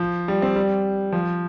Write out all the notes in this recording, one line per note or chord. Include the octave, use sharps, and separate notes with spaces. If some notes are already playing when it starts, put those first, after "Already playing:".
Already playing: F3
G3
C4
G3
F3